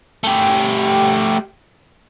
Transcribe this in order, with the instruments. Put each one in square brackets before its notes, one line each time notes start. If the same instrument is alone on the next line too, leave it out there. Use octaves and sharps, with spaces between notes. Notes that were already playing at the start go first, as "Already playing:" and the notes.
[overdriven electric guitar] A3 G4